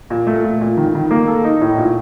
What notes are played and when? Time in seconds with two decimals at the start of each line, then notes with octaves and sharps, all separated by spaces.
0.10 A#2
0.27 A3
0.44 A#2
0.61 A#2
0.77 D#3
0.95 D#3
1.11 A#3
1.28 A4
1.44 D#4
1.61 A2
1.78 A#2